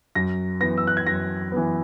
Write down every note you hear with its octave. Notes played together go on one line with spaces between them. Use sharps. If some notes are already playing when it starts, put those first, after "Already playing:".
F#2 A#6
E3 B3 A#6
E6
F#6
G#6
F#2 A#6
E3 B3